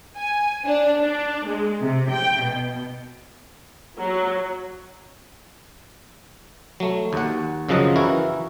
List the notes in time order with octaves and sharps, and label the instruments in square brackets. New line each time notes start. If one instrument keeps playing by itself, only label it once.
[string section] G#5
D4
D4
G#3
C3
G5
B2
[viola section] F#3
[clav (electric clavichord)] F#3 A3
D#2 F#5
F#2 C#3 F3 F#3 D#5 F#5
E3 E4 F#4 A#4